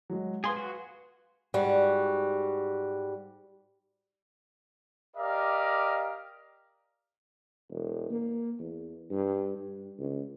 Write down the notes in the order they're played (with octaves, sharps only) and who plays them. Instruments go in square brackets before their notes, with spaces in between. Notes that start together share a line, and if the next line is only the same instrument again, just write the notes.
[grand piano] F#3 G#3
[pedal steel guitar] G#4 C6 [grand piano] B4 F5
[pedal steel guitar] F#4
[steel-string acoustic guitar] G#2 G3 F#4
[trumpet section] G4 A#4 D5 D#5 F5
[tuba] E1
A#3
E2
G2
G2
C#2